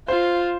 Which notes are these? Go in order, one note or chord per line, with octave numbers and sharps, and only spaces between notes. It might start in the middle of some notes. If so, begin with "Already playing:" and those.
F4 C5